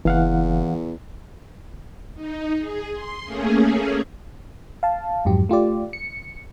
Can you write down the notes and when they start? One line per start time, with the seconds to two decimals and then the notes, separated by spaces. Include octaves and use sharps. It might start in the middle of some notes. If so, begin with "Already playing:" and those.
0.05 F#1 E2 E3 F5 F#5
2.15 D#4
2.59 G#4
2.93 C6
3.24 A3 A#3 C#4 G#4
4.83 F5 A5
5.25 F2 G#2 F#3 G4
5.49 A3 F4 G4 D5
5.93 C#7